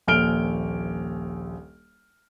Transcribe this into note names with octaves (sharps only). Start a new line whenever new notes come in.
D#1 A#1 F6 D7 G7